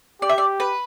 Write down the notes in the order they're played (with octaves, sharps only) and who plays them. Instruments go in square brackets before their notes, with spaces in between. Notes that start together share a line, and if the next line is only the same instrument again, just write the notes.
[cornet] G4 [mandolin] D5
[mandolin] E5
D5
B4